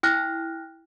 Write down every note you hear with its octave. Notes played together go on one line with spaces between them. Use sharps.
E4 G5 F6 F#6 A#6